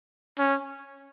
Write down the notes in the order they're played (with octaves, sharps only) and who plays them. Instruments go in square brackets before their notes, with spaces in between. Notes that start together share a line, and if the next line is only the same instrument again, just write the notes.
[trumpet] C#4